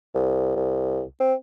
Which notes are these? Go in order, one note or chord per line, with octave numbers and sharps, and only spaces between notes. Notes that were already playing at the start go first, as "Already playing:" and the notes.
C2
C2
C4